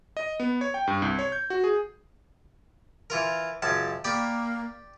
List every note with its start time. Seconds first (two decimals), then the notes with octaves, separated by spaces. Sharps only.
0.17 D#5
0.40 B3
0.61 C#5
0.74 G5
0.87 G2
1.02 C2
1.19 C#5
1.32 G6
1.50 F#4
1.64 G#4
3.10 E3 F4 A#4
3.62 C#2 F#2 A5
4.04 A#3 G4 D5 B5